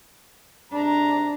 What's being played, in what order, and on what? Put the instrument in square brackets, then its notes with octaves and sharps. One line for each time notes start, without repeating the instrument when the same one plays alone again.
[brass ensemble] G#2 C3 A#5 [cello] D4